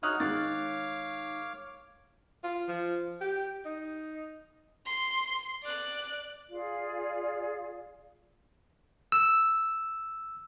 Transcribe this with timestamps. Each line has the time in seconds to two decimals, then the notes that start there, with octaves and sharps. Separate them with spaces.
0.03 D#4 F#4 C#5 D#6 F6 F#6
0.20 D#3 G#3 C#5 F5 D6 A6
2.44 F4
2.68 F3
3.21 G4
3.66 D#4
4.86 C6
5.63 D5 F#6
6.52 F4 G#4 D5 F5
9.12 E6